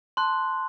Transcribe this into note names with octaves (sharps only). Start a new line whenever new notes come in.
A5 C6 F#6